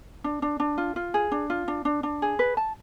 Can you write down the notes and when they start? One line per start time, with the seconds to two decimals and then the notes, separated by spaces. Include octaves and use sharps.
0.24 D4
0.42 D4
0.60 D4
0.78 F4
0.96 F4
1.14 G#4
1.32 D4
1.50 F4
1.68 D4
1.85 D4
2.03 D4
2.22 G#4
2.39 B4
2.57 A5